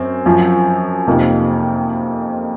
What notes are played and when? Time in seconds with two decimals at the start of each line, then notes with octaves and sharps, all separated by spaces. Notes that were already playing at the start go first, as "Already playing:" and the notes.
Already playing: F#2 C4
0.26 F#2 F3 C4
1.07 F2 C3 F3 A#3 D#4